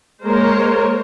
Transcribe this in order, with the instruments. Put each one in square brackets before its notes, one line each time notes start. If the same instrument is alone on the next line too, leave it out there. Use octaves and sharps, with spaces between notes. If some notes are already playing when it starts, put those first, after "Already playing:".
[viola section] G#3 A#3 A#4 C5 C#5